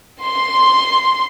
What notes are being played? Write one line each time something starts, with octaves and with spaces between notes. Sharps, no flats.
C6